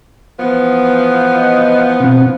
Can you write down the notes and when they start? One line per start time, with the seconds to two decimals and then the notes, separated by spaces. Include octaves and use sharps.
0.39 E3 F3 B3
1.37 D#5
2.00 B2 C4